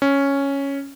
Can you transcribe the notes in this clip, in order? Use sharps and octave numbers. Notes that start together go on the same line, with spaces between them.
C#4